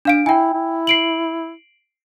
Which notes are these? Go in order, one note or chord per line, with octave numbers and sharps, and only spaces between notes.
D4 F5 D7
E4 G5 G#5
E4
C7 D7 F#7